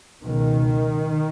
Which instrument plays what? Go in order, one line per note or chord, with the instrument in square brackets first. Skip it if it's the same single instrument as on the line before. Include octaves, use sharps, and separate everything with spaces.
[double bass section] C#2 B2 D#3